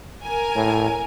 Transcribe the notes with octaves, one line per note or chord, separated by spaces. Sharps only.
A#4 G#5
A2